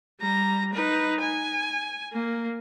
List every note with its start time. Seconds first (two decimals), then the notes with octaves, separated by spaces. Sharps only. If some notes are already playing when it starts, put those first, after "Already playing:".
0.20 G3 A#5
0.73 D#4 B4
1.21 G#5
2.13 A#3